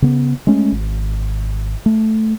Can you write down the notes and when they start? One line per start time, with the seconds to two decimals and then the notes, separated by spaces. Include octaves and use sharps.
0.02 C#3 B3
0.47 G#3 A3 C#4
0.72 G#1
1.86 A3